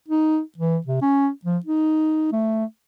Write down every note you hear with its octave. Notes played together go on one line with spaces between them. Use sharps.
D#4
E3
C3
C#4
F3
D#4
A3